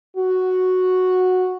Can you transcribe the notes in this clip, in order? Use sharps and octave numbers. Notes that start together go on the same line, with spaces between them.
F#4